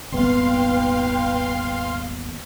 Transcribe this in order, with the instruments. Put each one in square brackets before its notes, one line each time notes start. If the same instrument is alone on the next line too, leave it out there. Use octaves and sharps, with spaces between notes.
[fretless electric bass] D#1 G#1 B3 [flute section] B4 G5 [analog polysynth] F5 C6